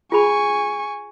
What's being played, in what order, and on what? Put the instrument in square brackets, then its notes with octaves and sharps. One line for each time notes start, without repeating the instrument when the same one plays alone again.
[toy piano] F4 G#4 B5 [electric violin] G#5 C#6